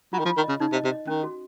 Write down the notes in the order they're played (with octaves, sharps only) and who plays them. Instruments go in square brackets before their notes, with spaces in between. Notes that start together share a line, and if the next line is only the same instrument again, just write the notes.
[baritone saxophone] F#3 [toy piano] F4
[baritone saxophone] D#3
F3
[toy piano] F4
[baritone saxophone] D#3
[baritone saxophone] C#3 [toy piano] D#5
[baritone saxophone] C#3 [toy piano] D#4
[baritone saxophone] C3
[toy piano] D#5
[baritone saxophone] C3
[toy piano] D#5
[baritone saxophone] D#3 [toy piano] C#4
[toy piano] F#4